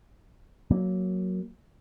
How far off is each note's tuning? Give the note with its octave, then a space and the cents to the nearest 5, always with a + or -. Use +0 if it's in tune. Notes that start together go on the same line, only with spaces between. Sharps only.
F#3 +0 A#3 +0